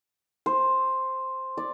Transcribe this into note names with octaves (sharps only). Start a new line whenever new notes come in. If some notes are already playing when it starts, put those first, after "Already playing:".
C5
D5